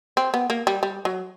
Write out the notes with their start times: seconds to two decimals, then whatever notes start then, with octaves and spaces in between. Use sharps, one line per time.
0.17 C4
0.34 B3
0.50 A#3
0.67 G3
0.83 G3
1.05 F#3